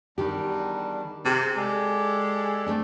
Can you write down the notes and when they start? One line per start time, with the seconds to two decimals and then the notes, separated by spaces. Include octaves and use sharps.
0.18 E2 D#3 G3 D4 G4
1.25 C3 G#4
1.57 G#3 G4 A4 D5
2.66 A3 C4 D4